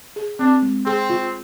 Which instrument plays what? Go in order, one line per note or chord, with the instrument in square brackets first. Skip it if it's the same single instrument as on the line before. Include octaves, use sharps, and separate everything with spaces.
[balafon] G#4
[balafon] C4 [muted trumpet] D4
[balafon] G#3
[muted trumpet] C4 [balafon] G#4
[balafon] F4